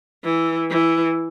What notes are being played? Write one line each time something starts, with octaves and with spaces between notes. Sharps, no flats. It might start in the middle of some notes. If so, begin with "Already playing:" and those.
E3
E3